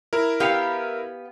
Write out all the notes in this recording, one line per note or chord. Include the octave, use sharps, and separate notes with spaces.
E4 A#4
B3 G4 F5